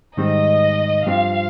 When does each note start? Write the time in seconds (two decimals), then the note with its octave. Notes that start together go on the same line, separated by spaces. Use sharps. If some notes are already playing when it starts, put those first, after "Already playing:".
0.17 G#2 D#3 G3 C4 D#5
1.06 G2 F3 C4 F4 F5